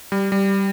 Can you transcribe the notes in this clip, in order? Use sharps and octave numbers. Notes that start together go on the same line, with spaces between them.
G3
G3